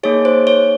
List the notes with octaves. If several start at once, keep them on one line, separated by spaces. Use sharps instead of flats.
A#3 D#4 G#4 C#5
C5
C#5